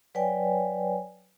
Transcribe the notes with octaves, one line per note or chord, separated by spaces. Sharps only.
F#3 B4 C#5 D5 G5 G#5